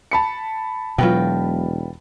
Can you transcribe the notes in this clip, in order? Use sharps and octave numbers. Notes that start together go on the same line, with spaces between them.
A5 B5 C#7
E1 B2 F#3 F4 B4 G5